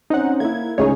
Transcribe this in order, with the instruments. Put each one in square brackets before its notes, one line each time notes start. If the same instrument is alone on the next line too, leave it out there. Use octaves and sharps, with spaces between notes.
[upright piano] C4 C#4 [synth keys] D#4 F#5
[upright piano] A#3 A#4 [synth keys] E4 G#6
[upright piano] C#2 C#3 D#5 [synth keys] D#4 G#4 C#5